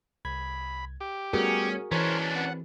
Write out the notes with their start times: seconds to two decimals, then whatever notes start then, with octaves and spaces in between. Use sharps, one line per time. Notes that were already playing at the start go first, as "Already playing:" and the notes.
0.25 C2 B5 G#6
1.01 G4
1.33 G3 A3 B3 C#4 F#4 G#4 A#4
1.92 E3 C#4 D4 A#4 C5 C#5 B6
2.36 C4 B4 F#5